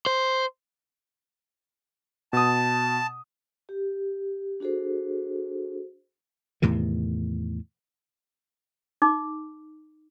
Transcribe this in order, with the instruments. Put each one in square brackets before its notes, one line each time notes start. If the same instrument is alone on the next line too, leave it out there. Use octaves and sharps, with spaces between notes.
[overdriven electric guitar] C5
[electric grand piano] B2 D#6 [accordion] A5
[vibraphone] G4
D4 F#4 G#4 A4 C5
[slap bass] E2 A2 C3 D#3
[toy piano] D#4 D6